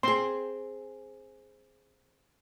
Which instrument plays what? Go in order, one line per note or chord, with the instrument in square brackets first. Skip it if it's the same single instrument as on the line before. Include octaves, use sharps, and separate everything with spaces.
[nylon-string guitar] C4 G#4 [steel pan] C6